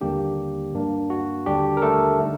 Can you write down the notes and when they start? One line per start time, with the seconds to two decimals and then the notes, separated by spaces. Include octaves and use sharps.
0.01 D#2 D3 G3 A#3 D4 G4
0.73 G2 F#3 A#3 D4
1.10 F#4
1.46 D#2 D3 G3 D4 G4
1.77 A#4
1.82 A3 A4
2.19 D3 A3 D#4